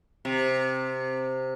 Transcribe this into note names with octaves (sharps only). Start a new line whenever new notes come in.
C3